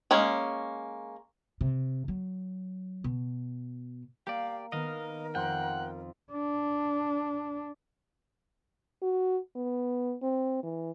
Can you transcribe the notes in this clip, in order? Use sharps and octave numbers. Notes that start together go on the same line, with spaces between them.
G#3 A#3 C#4
C3
F#3
B2
A#3 G4 D5 F5
D#3 B3 A#4 D#5 F5
F2 F#5 G5 C6
D4
F#4
B3
C4
E3